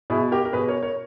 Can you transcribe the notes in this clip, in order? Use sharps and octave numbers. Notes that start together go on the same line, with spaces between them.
B2 E4 G#4
G4 A#4
A#4
B2 G#4 B4
A#4 C#5
A#4 C#5